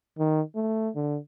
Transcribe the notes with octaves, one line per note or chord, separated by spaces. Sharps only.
D#3
A3
D3